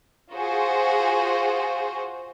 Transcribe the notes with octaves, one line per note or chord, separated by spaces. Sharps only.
F4 F#4 G#4 C5